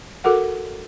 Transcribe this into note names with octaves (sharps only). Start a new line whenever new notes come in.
F#4 A4 A#4 F#5